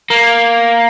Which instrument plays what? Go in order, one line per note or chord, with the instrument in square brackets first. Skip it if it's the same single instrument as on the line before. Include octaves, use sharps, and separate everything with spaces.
[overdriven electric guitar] A#3